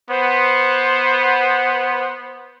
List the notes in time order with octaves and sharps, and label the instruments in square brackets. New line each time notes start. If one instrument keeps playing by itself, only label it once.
[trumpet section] B3 C5